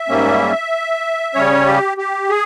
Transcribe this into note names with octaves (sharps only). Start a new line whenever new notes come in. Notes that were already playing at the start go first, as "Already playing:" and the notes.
Already playing: E5
G#2 G3 A#3 C#4
C#3 G3 C#4 C#5
G4
G4
G#4